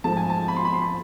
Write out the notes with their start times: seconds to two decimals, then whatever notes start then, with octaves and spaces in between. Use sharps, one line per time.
0.04 G#2 F3 A3 A5
0.17 G#5
0.30 A5
0.48 B5
0.56 C6
0.65 B5
0.73 C6
0.82 B5